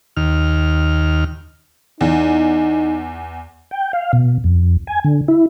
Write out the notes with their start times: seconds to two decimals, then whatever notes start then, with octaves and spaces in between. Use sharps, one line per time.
0.17 D#2 F6
2.01 E2 D#4
3.71 G5
3.93 F5
4.13 B2
4.44 F2
4.87 G#5
5.04 D3
5.28 E4